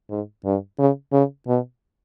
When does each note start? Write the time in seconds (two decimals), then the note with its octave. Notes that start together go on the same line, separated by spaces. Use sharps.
0.10 G#2
0.45 G2
0.79 C#3
1.12 C#3
1.47 B2